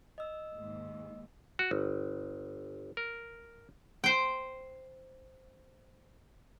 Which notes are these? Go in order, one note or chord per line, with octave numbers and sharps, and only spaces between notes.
D#5 E6
D#2 G#2
F#4
G1
A#4
C5 G5